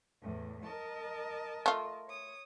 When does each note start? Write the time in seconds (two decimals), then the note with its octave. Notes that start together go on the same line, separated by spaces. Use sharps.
0.22 E2 A2
0.63 A#4 D#5 A5
1.66 A3 F4
2.08 C#5 D#6